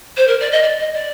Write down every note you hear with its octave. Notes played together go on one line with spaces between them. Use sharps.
C5
A#4
D5
D#5
D5
D#5
D5